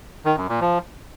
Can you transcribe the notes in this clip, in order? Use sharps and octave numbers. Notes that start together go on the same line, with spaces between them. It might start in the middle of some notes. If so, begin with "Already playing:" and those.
D#3
F#2
A#2
F3